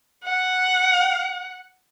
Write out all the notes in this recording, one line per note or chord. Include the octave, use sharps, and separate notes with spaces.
F#5